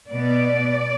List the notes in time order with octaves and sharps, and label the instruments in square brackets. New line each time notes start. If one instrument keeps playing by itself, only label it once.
[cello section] B2 B3 D5